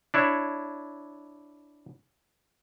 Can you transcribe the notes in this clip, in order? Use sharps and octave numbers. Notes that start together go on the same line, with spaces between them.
D4 E4 C#5